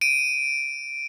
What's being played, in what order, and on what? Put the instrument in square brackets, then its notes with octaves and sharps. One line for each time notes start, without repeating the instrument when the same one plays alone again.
[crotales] D7 D#7